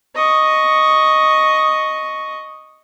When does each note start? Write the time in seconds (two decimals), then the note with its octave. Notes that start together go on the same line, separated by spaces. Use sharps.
0.15 D#5 C#6